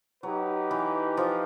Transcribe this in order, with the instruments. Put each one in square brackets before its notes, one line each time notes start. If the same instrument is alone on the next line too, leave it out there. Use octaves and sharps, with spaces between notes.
[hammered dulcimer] F#3 [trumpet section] D#4 G4 B4
[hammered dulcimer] E3
F3